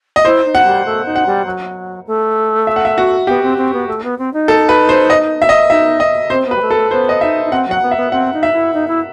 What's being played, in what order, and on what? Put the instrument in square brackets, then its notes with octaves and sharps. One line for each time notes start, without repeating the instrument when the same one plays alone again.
[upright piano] D#5
[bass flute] E4 [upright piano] C5
[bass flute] D#4
[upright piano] F#5
[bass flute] G3
A3
D#4
[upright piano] F#5
[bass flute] G3
F#3
A3
[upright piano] E5
F#5
E5
F#4
[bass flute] B3 [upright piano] G4
[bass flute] C4
C4
B3
A3
B3
C4
D#4
[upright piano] A4
B4
C5
D#5
E5
D#5
[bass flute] D#4 [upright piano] E5
[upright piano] D#5
[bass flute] C4 [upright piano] C5
[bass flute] B3
[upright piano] B4
[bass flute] G3
A3
[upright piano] A4
[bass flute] A3
[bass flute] B3 [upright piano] C5
[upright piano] D#5
[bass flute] D#4 [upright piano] E5
[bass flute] D#4
[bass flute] C4 [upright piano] F#5
[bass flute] F#3 [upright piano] F#5
[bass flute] B3
[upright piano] E5
[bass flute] B3
[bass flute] C4 [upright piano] F#5
[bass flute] D#4
[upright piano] E5
[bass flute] E4
D#4
E4